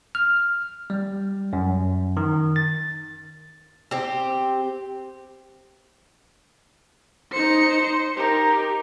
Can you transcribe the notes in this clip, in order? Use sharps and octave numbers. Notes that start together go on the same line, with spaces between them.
F6
G3
F#2
D#3
A6
C4 G4
D#4 C5 C#7
D#4 G4 A#4